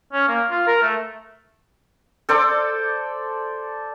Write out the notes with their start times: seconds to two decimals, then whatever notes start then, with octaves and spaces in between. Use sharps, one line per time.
0.13 C#4
0.28 A#3
0.51 F4
0.67 A#4
0.82 A3
2.29 A4 C5 D5